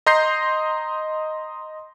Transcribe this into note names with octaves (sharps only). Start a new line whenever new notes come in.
D#5 A#5 C6 G6 A#6 C7